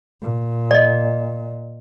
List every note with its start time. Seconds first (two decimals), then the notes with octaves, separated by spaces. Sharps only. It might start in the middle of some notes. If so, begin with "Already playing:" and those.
0.22 A#2
0.71 D5 D#5